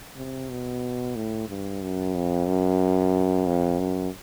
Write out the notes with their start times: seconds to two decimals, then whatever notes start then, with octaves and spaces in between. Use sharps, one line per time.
0.17 C3
0.50 B2
1.15 A2
1.49 G2
1.82 F#2
2.15 F2
2.47 F#2
3.46 F2
3.79 F#2